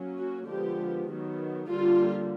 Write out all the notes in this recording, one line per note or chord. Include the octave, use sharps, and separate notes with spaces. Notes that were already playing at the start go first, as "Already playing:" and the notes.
Already playing: F#3 A#3 C#4
F#4
D3 F3 G#3 B3 G4
D#3 F#3 B3
D3 G3 A#3 F4